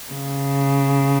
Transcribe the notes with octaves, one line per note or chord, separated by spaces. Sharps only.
C#3